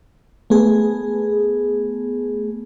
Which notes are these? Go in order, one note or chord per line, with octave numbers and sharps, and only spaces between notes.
A3 B3 G#4